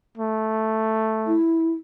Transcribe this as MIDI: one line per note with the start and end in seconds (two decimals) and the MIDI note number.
0.18 1.38 57
1.27 1.72 64